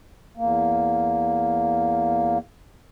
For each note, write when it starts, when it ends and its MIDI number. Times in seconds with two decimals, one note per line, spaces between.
0.37 2.38 40
0.37 2.38 58